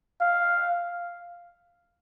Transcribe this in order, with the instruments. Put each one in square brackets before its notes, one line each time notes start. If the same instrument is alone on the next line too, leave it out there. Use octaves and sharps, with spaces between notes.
[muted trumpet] F5